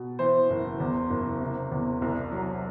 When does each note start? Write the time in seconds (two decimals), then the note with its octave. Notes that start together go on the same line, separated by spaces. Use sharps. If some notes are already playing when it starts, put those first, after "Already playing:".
Already playing: B2
0.19 E3 C5
0.50 F#1
0.80 E2
1.10 F#1
1.40 C3
1.72 E2
2.02 C2
2.32 F#3